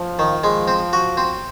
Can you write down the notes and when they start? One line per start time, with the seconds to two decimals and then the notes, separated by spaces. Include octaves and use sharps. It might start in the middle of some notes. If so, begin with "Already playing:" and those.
Already playing: F3
0.19 D#3
0.43 F3 G#3
0.68 C4
0.93 F#4
1.17 C4